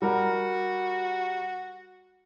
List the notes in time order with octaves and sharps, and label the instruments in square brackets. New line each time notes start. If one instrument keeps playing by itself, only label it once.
[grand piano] G3 A#4 F#5 [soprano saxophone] F#4